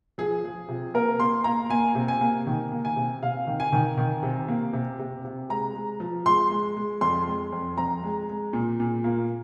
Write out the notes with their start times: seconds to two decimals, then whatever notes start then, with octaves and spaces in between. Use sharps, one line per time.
0.18 F3 G#4
0.44 F3
0.68 C3
0.94 A#3 A#4
1.20 A#3 C6
1.44 A#3 A#5
1.70 A#3 G#5
1.95 C3
2.08 G#5
2.21 A#3
2.47 D#3
2.72 A#3
2.85 G#5
2.96 C3
3.23 C3 F5
3.47 D#3
3.60 G#5
3.73 D#3
3.98 D#3
4.23 C3
4.48 A#3
4.73 C3
4.99 C3
5.25 C3
5.50 G#3 A#5
5.75 G#3
6.00 F3
6.26 G#3 C6
6.51 G#3
6.76 G#3
7.01 F2 C6
7.28 G#3
7.53 F2
7.77 F2 A#5
8.04 G#3
8.29 G#3
8.53 A#2
8.80 A#2
9.04 A#3